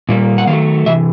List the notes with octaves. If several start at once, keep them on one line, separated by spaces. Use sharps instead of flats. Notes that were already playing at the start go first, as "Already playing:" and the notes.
A#2 G3 A#3
F#5
D#3 F#3 A3 F5
C3 E3 E5